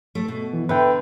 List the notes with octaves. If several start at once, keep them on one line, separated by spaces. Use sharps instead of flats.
A3
B2
E3
D3 B4 E5 G5